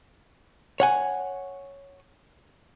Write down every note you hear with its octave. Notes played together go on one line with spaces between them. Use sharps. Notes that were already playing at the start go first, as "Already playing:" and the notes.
C#5 F#5 G#5